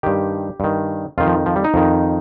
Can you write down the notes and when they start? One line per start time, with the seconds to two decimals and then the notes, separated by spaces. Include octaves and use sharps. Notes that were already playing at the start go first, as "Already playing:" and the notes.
0.03 G2 D#3 G4
0.60 G2 D#3
1.18 F2 D#3 F4
1.27 F3
1.46 F3
1.56 G3
1.64 D#4
1.74 F2 D#3